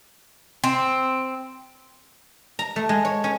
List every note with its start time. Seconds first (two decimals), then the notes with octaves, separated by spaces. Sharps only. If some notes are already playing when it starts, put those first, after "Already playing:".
0.64 C4
2.59 A#5
2.76 A3
2.89 G#3
3.05 C#5
3.24 C#4